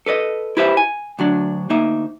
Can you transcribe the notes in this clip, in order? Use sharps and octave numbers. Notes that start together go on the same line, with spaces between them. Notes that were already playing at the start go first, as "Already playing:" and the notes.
A4 B4 D5 D#5
E4 G4 B4 C5 D5 E5
G#5
D2 F#3 D4
D2 A#3 D#4 E5